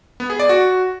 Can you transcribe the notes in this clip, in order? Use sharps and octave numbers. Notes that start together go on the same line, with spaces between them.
B3
G#4
D5
F#4